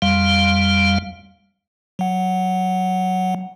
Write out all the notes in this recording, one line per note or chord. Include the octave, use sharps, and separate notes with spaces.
F2 G3 F5
F#3 F#5